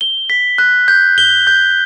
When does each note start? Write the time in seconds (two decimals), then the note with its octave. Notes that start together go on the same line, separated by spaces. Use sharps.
0.01 G7
0.30 B6
0.58 F#6
0.88 G6
1.18 G7
1.47 G6